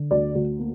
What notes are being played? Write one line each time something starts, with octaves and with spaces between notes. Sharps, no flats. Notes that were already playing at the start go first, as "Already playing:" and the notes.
Already playing: D3
D2 D5
D2
A#3